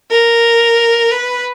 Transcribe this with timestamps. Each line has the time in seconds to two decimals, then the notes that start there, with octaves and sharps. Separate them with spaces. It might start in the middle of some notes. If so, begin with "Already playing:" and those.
0.10 A#4
1.12 B4